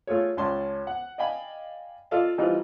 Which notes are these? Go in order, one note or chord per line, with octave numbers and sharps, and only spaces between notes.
A3 F4 G#4 C#5
C#2 C#4 D5 A5 C6
F#5
D5 D#5 F5 G5 G#5 B5
F4 A4 D5 D#5 F5 A5
E3 G3 D#4 F4 C5